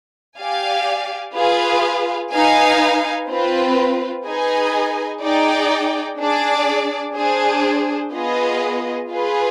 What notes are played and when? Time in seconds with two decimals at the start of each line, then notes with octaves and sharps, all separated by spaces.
0.37 G4 D5 F5 G#5
1.34 F4 G#4 B4 F5
2.31 D#4 B4 F5 G#5
3.28 C4 F4 B4
4.25 D#4 G#4 B4 D#5 G#5
5.22 D#4 G#4 D5 G5
6.19 D4 G#4 D5
7.15 D4 G#4 C5
8.12 B3 F4 G#4 B4 D#5
9.09 F4 G#4 B4